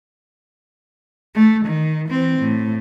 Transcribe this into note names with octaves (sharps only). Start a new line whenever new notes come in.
A3
D#3
E3 C4
A2